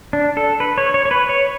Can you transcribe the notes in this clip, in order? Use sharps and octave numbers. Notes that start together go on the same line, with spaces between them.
D4
A4
B4
C#5
C#5
C#5
B4
C#5